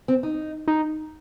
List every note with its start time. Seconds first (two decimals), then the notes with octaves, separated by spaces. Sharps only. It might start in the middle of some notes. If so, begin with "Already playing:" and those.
0.08 C4
0.23 D#4
0.68 D#4